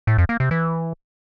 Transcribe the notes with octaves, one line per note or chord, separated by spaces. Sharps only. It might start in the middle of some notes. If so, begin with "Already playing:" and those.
A2
F2
A#3
C3
E3